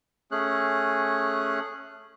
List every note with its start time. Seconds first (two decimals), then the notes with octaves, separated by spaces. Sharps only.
0.31 A3 C#4 G#4 F#6